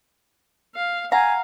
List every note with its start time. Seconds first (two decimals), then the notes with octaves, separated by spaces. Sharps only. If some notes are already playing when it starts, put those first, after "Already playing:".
0.75 F5
1.12 F5 F#5 G#5 A#5